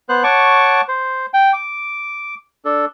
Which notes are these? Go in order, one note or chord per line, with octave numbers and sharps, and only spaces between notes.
B3 C5 F#6
C#5 F#5 A5 C#6 D6
C5
G5
D6
D4 A4